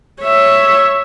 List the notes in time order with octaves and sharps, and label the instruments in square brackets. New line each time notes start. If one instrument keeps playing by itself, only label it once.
[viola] C#5 E5